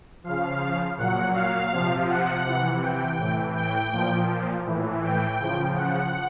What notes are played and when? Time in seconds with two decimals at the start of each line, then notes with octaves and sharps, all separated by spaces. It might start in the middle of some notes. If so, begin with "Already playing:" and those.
0.24 C#3 F3 F5
0.98 A#2 F#3 F#5
1.34 F5
1.72 C3 F3
2.09 F#5
2.45 C3 E3
2.81 G5
3.19 A2 E3
3.56 G5
3.92 A#2 F3
4.66 A2 E3
5.03 G5
5.40 C#3 F3
5.76 F#5